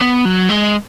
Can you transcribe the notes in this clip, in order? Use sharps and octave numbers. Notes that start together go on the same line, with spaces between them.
B3
F#3
G#3